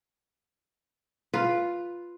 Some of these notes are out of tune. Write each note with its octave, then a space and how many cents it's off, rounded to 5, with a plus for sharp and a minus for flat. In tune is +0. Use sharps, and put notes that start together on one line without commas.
F4 +0 B4 +0